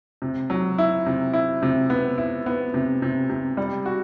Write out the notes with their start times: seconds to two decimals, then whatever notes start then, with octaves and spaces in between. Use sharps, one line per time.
0.22 C3
0.50 F#3
0.78 E4
1.06 C3
1.33 E4
1.62 C3
1.90 B3
2.18 E4
2.46 B3
2.74 C3
3.02 C3
3.29 C3
3.57 G3
3.86 F#4